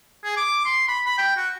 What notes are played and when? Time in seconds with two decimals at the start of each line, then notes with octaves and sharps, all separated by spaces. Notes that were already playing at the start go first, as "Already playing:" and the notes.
0.24 G#4
0.37 D6
0.65 C6
0.88 B5
1.06 B5
1.18 G5
1.37 F#4